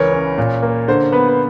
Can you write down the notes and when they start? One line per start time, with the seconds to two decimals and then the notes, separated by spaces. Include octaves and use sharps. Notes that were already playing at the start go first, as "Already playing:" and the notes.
Already playing: C#2 E3 A#4 B4 C#5
0.12 C#4
0.38 A#2
0.63 A#3
0.88 D3 C5
1.12 B3 B4
1.28 B4